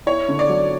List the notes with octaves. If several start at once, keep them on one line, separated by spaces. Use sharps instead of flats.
E4 C#5
D3
D5
F#3